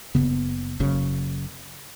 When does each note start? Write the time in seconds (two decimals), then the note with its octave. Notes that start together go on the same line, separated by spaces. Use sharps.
0.15 F#1 F#2 C#3 B3
0.80 F#1 F#2 C#3